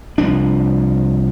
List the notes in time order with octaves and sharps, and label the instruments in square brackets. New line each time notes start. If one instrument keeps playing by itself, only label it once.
[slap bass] C2 F3 D4